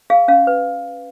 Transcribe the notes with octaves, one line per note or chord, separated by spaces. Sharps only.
G#4 F5
C#4 F5
B4